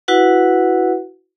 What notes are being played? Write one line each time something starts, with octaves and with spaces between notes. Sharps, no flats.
E4 F#4 B4 F#5